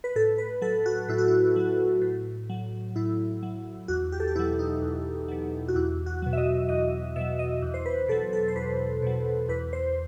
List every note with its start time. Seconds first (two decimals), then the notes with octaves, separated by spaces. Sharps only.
0.04 B4
0.16 A2 A4
0.38 B4
0.62 F#3 A4
0.86 F#4
1.09 A2 E4
1.18 F#4
1.28 E4
1.56 F#3
2.02 A2
2.49 F#3
2.96 A2 E4
3.43 F#3
3.88 E2 F#4
4.12 G4
4.20 A4
4.28 G4
4.35 B2 E4
4.39 F#3
4.59 D#4
4.82 E2
5.28 B2 F#3
5.68 F#4
5.76 E2 E4
6.06 F#4
6.22 B2 F#3
6.33 E5
6.38 D#5
6.69 E2 D#5
7.16 B2 F#3 E5
7.39 D#5
7.62 E2
7.74 C5
7.86 B4
8.08 B2 F#3 A4
8.33 A4
8.48 C5
8.56 E2 B4
9.02 B2 F#3
9.49 E2 B4
9.73 C5